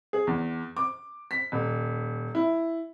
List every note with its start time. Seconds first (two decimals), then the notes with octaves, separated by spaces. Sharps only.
0.13 G#4
0.27 E2
0.77 D6
1.31 B6
1.52 D#1
2.35 E4